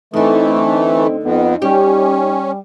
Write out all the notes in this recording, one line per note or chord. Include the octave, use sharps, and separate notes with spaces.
D2 D3 E3 A3 C4 D#4 D#5
F2 B3
G3 C#4 G4